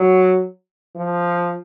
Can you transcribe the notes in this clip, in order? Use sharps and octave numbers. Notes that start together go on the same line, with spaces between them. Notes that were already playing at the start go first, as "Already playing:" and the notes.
Already playing: F#3
F3